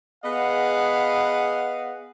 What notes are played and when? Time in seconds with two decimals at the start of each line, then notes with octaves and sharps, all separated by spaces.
0.24 B3 G#4 B4 D#5 F5 F#5